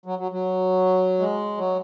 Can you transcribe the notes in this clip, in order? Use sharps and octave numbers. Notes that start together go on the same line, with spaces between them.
F#3
F#3
F#3
G#3
F#3